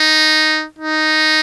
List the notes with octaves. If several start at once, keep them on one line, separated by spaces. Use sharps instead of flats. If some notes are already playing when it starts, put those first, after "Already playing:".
Already playing: D#4
D#4